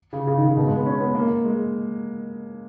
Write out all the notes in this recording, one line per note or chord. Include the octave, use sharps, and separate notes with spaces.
C#3
C#3
D#3
C#3
B2
G#3
B3
C#4
B3
A#3
G#3